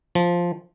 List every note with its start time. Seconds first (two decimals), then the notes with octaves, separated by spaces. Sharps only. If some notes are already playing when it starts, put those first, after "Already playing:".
0.15 F3